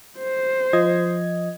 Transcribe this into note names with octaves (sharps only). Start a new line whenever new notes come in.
C5
F3 D#5 G#6